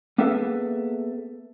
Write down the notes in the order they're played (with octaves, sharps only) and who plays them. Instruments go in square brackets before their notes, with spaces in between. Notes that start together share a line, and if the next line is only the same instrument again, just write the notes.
[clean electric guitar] A#3 B3 G#4 A4 B4 E5